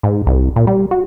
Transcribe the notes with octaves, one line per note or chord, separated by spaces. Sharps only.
G#2
C2
A#2
G3
F#4